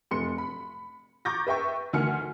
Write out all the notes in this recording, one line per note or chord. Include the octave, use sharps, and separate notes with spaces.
F1 C6 C#7
B5
A#5 C#6 D6 G6 A6 A#6
B4 E5 G5 C#6
D2 D#3 G#5 F6 C#7